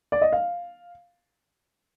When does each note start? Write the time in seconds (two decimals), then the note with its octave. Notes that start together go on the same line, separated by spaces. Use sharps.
0.12 D5
0.22 D#5
0.32 F5